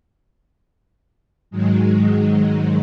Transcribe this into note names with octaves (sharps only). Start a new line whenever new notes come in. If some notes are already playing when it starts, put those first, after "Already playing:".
G#2 D#3 F#3 G#3